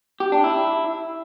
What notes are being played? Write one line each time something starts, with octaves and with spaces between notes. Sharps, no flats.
G4
D4
E4